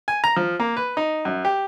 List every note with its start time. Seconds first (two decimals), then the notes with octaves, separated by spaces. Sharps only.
0.08 G#5
0.24 A#5
0.36 F3
0.60 A#3
0.77 B4
0.97 D#4
1.25 F#2
1.45 G4